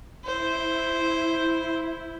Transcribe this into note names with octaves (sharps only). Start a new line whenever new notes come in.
E4 C5